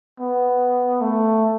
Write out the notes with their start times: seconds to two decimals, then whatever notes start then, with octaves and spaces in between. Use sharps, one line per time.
0.20 B3
1.01 A3